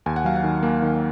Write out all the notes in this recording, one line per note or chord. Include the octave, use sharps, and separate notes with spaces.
D#2 G#5
F#5
F#3 F5
F#5
D#3
A#3
D#3